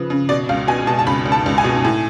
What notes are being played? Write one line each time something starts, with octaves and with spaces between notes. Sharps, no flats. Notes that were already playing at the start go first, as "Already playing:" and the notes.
Already playing: C#3 F3 B4
C#3
B2 D5
C#2 F5
B2 G#5
B2 A5
A5
C#2 B5
C#2
A5
C#2
G#5
B2
A2